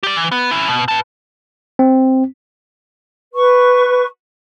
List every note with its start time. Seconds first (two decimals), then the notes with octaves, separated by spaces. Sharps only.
0.03 G4 D5
0.16 E3
0.32 B3
0.51 C#4 E4
0.68 B2
0.88 B4 A5
1.79 C4
3.34 B4 C#6